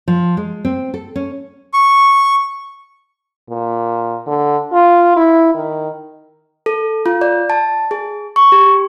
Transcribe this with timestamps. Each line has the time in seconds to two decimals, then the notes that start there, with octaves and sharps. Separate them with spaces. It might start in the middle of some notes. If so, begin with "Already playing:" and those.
0.08 F3
0.37 G#3
0.65 C4
0.94 A4
1.16 C#4
1.73 C#6
3.50 A#2
4.27 D3
4.73 F4
5.17 E4
5.55 D#3
6.66 A4
7.06 F4
7.21 D5
7.50 A5
7.91 G#4
8.36 C#6
8.52 G4